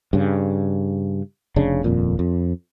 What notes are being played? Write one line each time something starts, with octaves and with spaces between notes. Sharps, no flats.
G2 C#3
F1 C#3 D4
D#1 F2 A#2
F2